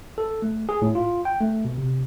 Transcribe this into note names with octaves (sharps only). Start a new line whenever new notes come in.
A4
A3
G#4
A2
F4
G5
A3
B2
C3